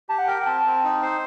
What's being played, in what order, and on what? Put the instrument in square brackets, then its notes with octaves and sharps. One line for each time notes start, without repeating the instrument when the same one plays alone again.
[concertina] G4 [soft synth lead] A5
[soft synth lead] F#5
[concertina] A#4 [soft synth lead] G5
[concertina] C4 [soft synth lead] A5
[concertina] C4
D#4
C5